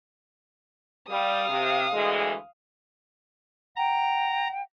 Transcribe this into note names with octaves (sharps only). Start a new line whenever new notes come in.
G3 F5 D#6
C3
D2 E3 G#3
F#5 G5 A#5